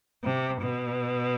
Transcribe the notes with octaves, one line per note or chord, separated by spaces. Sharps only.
C3
B2